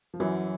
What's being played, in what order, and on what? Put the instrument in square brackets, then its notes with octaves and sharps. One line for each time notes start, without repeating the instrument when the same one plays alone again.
[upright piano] F3
[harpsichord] F#2 [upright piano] E3 F#3